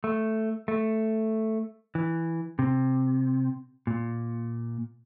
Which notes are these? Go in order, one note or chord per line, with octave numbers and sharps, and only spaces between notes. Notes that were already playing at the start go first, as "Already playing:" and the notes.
A3
A3
E3
C3
A#2